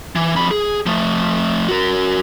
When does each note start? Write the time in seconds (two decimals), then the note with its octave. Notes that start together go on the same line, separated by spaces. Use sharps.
0.16 E3
0.36 F2 B5
0.51 G#4
0.86 F3 A3
1.68 F#4 A#4